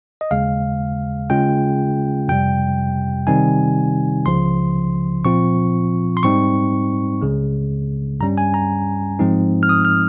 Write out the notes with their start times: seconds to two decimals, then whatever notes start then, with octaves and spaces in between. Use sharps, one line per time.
0.21 D#5
0.31 D#2 C#3 G#3 F5
1.30 C#3 G#3 C#4 F4 G5
2.28 F2 C3 G3 G5
3.27 C3 D#3 G3 C4 D#4 G#5
4.26 C#2 C#3 F3 C6
5.24 A#2 F3 C4 F4 C#6
6.17 C6
6.23 G#2 G3 C4 D#4 C#6
7.21 C#2 C#3 G#3
8.20 G2 G3 C#4 A#5
8.38 G#5
8.54 A#5
9.19 G#2 F3 G#3 C4 D#4
9.63 F6
9.69 D#6
9.85 F6